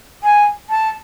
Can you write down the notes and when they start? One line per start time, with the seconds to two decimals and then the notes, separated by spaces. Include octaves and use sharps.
0.24 G#5
0.70 A5